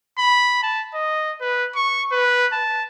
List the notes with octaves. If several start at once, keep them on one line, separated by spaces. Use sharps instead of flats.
B5
A5
D#5
B4
C#6
B4
A5